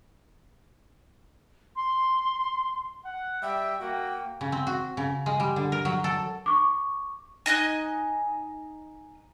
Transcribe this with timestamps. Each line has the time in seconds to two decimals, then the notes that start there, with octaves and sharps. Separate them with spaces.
1.75 C6
3.05 F#5
3.43 G3 E5 G5
3.81 A#3 F#4 G5
4.41 C#3
4.52 C4
4.67 F#4
4.97 C#3
5.26 G#3
5.40 G3
5.56 D3
5.72 A#4
5.85 F#3
6.04 A4
6.46 C#6 D6
7.46 D#4 D#5 G#5 F#6